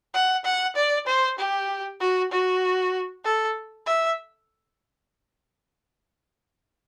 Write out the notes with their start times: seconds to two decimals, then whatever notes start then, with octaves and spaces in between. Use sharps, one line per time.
0.14 F#5
0.45 F#5
0.76 D5
1.07 C5
1.38 G4
2.00 F#4
2.31 F#4
3.24 A4
3.86 E5